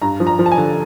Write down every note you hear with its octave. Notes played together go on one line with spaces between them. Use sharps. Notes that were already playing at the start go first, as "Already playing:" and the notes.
G2 A#5
F3
A#5
F3
A5
G#5
D3